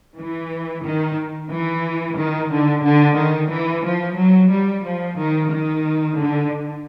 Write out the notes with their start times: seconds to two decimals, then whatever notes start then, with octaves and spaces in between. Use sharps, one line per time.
0.17 E3
0.84 D#3
1.51 E3
2.17 D#3
2.51 D3
2.84 D3
3.17 D#3
3.51 E3
3.84 F3
4.18 F#3
4.51 G3
4.85 F3
5.18 D#3
5.51 D#3
6.18 D3